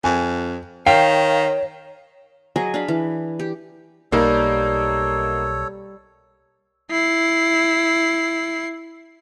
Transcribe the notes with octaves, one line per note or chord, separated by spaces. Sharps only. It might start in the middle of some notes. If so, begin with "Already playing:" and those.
F2 G#5
D#3 C#5 F5 G5
F#3 G#4 D#5 G#5
D4 F5 B5
E3
G4
B1 G3 A#3 D#4 A4 A#4 C#5
E4 C7